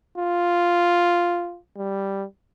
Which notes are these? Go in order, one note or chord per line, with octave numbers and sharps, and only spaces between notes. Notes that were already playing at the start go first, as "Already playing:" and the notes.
F4
G3